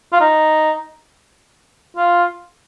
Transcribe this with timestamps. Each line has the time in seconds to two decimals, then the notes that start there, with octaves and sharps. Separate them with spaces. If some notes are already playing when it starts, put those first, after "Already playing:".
0.13 F4
0.21 D#4
1.97 F4